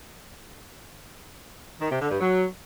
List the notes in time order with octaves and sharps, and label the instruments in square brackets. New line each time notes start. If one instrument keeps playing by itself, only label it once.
[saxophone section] D#3
C3
D3
G2
F#3